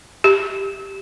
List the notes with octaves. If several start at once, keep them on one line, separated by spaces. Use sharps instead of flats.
G4